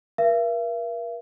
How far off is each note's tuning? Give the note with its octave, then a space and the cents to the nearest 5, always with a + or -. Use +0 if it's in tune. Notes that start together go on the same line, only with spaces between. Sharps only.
A#4 +40 E5 +45